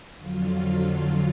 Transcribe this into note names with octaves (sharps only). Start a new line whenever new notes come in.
F2 D3 F#3 F4